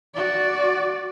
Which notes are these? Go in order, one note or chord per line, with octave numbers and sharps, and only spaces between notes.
F#4 D5